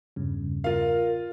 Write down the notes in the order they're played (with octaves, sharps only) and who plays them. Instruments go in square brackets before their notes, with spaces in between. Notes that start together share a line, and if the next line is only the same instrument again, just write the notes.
[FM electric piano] E2 G2 C#3
[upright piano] F4 F5 [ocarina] A#4